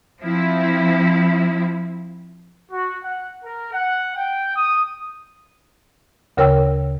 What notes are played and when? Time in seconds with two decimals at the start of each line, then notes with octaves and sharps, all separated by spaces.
0.22 F3 C4 E4
2.72 F#4
3.02 F#5
3.43 A#4
3.72 F#5
4.15 G5
4.55 D#6
6.37 D2 C#3 A#4 C#5 G5 E6